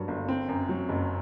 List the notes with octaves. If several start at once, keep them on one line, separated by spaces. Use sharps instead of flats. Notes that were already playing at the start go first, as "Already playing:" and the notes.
Already playing: G2 F#3 A#3
G1
C4
F#2
F#3
F#1